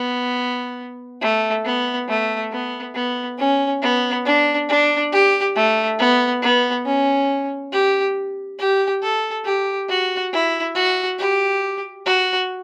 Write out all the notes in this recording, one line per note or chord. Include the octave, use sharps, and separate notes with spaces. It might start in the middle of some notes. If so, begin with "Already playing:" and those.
Already playing: B3
A3
B3
A3
B3
B3
C#4
B3
D4
D4
G4
A3
B3
B3
C#4
G4
G4
A4
G4
F#4
E4
F#4
G4
F#4